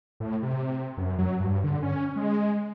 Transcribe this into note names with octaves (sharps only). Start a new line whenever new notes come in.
A2
C3
F#2
F#3
G2
D3
C#4
G#3